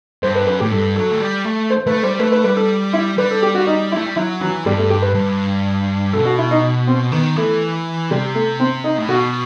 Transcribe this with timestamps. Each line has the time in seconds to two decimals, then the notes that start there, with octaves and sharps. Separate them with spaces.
0.23 G2 C5
0.35 B4
0.47 F#2 B4
0.60 A2 G4
0.72 G2 A4
0.96 F#3 A4
1.11 A3
1.21 G3
1.45 A3
1.70 C5
1.87 A3 B4
2.03 G3 C5
2.19 A3 B4
2.32 B4
2.44 G3 B4
2.56 A4
2.93 E4
3.18 G3 B4
3.31 A4
3.43 G4
3.55 F#4
3.67 D#4
3.92 E4
3.96 A3
4.06 G3
4.16 F#3 E4
4.41 E3 F#3
4.65 G2 G3
4.78 A3
4.90 G4
5.02 B4
5.15 G2
6.13 B2 A4
6.26 F#4
6.38 E4
6.51 D#4
6.87 C4
7.12 D#3 B3
7.36 E3 A3
8.11 C3 G3
8.35 A3
8.60 C4
8.84 D#4
8.98 A2
9.08 B2 F#4